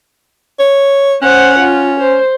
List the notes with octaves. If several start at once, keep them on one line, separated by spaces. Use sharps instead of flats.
C#5
C#4 C5 F#5
F4
C5